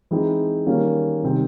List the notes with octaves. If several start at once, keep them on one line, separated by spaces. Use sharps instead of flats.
E3 G#3 C4 D#4
D#3 G3 A#3 C#4
C3 D#3 G3 C4